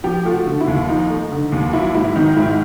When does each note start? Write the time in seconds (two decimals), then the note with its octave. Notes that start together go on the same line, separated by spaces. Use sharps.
0.04 F3 G4
0.25 A3 F4
0.32 F#4
0.46 D3
0.61 E4
0.68 D#2
0.88 F3 D#4
1.09 A3
1.31 D3
1.52 D#2
1.73 F#3 E4
1.95 G#2 E4
2.16 D#3 D#4
2.36 G#2 E4